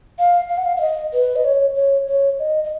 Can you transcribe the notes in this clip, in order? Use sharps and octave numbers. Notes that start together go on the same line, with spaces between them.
F5
F5
F#5
F5
F5
D#5
B4
D#5
C#5
C#5
C#5
D#5
D#5